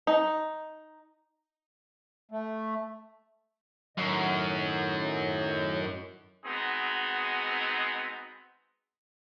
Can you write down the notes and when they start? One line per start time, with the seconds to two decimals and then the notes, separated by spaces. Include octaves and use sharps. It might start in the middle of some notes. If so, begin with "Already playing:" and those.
0.07 D#4
2.31 A3
3.97 F#2 A2 D#3 D#5
6.45 G#3 B3 C4 D#4 F#4 G#4